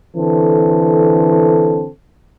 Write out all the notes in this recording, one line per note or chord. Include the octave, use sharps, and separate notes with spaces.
D3 E3 C4 A4